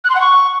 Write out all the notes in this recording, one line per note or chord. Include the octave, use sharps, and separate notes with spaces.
F#6
C6
F#5
C#6